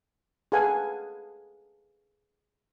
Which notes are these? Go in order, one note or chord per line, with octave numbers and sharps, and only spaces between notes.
G#4 A4 B4 F5 F#5 G#5